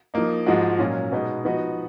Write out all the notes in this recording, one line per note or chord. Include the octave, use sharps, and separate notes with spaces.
F3 A#3 D#4
G#2 F3 G#3 D#4 F#4
A#2 F#3 C#4 F4
B2 G#3 B3 D#4
F3 B3 D#4 F#4